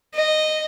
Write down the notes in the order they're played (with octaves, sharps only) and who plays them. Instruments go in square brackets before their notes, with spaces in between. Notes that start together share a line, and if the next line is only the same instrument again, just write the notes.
[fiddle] D#5